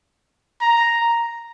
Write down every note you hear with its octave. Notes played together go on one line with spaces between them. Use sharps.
A#5